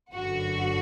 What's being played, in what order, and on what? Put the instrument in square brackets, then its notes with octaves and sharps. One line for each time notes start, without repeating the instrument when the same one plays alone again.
[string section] G1 F#2 D3 F#4